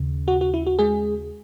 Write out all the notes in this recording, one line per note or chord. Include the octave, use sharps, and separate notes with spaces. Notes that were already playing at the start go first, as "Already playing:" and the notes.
Already playing: D#2 C#3
F#4
F#4
E4
F#4
G#3 G#4